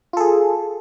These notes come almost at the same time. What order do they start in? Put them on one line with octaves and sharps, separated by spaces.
F4 A4 G#4